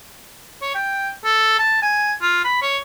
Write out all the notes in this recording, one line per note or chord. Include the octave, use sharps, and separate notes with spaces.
C#5
G5
A4
A5
G#5
F4
B5
C#5